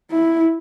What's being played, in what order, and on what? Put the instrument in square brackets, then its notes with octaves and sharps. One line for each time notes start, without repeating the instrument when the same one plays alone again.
[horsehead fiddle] E4